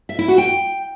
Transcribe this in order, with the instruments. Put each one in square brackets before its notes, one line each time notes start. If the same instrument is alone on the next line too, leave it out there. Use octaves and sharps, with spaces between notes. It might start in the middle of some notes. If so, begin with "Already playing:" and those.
[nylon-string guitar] E5
E4
F#4
G5